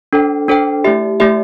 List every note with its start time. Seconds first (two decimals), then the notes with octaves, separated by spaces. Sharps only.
0.13 D4 A4 C5 G5
0.48 D4 A4 C5 G5
0.84 A3 E4 G4 E5
1.20 A3 E4 G4 E5